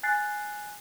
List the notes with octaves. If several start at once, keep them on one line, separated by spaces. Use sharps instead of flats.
G#5 F#6 A6 C7